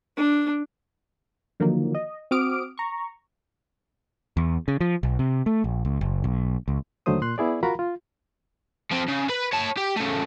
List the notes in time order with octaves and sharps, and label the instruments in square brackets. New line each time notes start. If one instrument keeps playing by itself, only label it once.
[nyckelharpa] D4
[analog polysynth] D3 D#3 F3 F#3 A#3
D#5
C4 F#4 D6 D#6 F6 D7
A#5 C#6
[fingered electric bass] E2
C#3
F3
B1
C3
A3
A#1
C#2
F#1
B1
C#2
[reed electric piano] D#2 D3 F#3 A3 C5 D#6
A#2 C6 F#6
B3 E4 G#4 D5
F4 F#4 A#4 F5 A#5 B5
F4
[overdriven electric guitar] F3 C4
C#3
B4 B5
C#5 A5
G4
C#3 A3